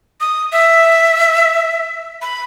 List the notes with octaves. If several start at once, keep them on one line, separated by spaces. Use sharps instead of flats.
D#6
E5
B5